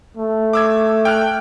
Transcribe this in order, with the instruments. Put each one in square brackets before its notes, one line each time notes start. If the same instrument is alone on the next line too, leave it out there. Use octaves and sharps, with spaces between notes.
[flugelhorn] A3
[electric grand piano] D6 E6 G#6
G5 F6 F#6